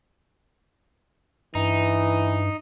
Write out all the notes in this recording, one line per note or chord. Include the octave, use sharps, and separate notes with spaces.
G2 E3 D#4